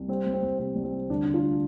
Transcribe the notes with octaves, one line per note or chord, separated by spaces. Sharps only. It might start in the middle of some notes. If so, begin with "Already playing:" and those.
Already playing: C2
G3 C4
C2
C4
C2
C3 C4
C2
C4
G3
D2 D4
D2 D4
F4